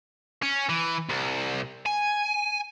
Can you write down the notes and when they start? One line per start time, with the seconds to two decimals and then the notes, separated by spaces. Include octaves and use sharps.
0.43 C#4
0.69 E3
1.09 C2
1.86 G#5